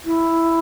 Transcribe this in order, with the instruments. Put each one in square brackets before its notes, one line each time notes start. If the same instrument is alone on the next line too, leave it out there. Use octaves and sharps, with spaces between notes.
[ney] E4